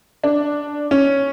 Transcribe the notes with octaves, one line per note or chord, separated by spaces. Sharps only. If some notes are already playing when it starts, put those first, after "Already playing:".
D4
C#4